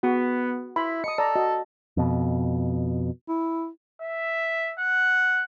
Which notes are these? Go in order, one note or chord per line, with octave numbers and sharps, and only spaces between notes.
B3 F#4 G#4
E4 B5 C6
D#5 A5 D#6 C#7
A4 D5 A#5
F#4 D#5
F2 B2
E4
E5
F#5